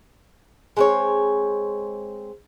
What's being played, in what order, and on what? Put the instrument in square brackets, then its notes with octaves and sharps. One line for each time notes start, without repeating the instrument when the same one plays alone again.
[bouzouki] G#3 C4 C#5